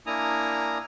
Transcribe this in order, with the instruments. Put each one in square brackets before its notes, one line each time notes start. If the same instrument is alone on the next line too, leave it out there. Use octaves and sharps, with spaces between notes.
[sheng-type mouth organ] A#3 D4 E4 G#5 A#5 D#6